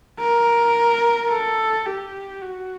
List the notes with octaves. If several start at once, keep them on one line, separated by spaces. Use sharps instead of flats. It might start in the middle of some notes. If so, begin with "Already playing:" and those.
A#4
A4
G4
F#4